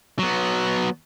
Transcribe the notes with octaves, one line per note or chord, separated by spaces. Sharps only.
F#3 B3